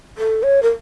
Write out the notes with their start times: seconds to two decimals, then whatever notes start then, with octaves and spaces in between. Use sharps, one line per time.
0.18 A4
0.43 C#5
0.62 A#4